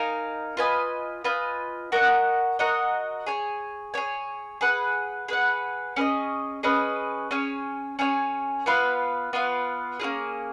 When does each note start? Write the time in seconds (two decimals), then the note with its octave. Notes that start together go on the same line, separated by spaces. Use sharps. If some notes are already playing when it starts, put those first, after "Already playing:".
Already playing: D#4 A#4 F5 G#5
0.57 F4 B4 D#5 G#5
1.24 F4 B4 D#5 G#5
1.92 F#4 A#4 D#5 F#5
2.59 F#4 A#4 D#5 F#5
3.27 G#4 C#5 G#5
3.94 G#4 C#5 G#5
4.61 G#4 B4 F#5
5.28 G#4 B4 F#5
5.96 C#4 G#4 B4
6.01 D#5
6.63 C#4 G#4 B4 D#5
7.31 C#4 G#4 C#5 G#5
7.99 C#4 G#4 C#5 G#5
8.66 B3 F4 B4 F5
9.33 B3 F4 B4 F5
10.00 A#3 C#4 F4 G#4